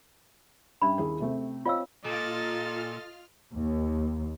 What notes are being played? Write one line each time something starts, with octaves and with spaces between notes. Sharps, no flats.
G2 G3 C#4 D4 E5 B5
D#2 E4 G#4
C3 A3 C4
C4 F4 C#5 D#5 F5 E6
A#2 F4 A4 D#5 F6 A6
D#2